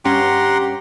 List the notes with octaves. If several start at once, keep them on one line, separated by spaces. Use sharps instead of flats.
G2 C#4 G4 F#5 A#5 C6